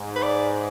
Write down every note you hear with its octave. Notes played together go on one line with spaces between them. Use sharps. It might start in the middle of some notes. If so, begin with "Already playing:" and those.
Already playing: G#2
B4
D5